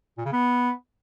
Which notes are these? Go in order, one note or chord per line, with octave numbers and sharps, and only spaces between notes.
A#2
C#3
B3